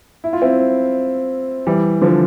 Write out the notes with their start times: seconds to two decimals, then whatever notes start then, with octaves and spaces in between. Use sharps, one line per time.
0.24 E4
0.33 F4
0.41 C4 E4
1.67 E3 G3
2.02 D3 F3